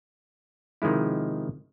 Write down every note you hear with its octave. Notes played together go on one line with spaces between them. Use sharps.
C3 D#3 F3 G#3 E4